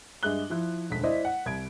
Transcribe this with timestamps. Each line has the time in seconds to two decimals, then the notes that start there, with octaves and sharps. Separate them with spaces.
0.23 G2 G#3 G#4 E5 F#6 G7
0.50 F3 E4 F#6
0.90 E1 D2 B6
1.03 E4 C5 D5 D#5
1.25 F#5
1.46 C2 G#6 D7